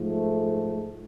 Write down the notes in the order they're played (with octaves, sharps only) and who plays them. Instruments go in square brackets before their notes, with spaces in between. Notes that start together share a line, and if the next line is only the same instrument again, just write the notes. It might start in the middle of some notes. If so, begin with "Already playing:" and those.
Already playing: [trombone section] G#2 F3 A3